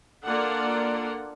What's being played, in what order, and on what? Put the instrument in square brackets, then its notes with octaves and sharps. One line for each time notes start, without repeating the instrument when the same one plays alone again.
[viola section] A#3 D4 F4 A4 D5 F#5